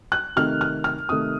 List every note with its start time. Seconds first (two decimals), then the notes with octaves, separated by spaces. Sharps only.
0.12 F#6
0.36 C3 D#3 A3 F6
0.61 F6
0.84 F6
1.09 C3 D#3 A3 D#6